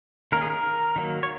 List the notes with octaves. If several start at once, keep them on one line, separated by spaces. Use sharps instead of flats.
D#3 A#3 C#4 A#4
G#4
A#4
D#3 F#3 A#3
C#5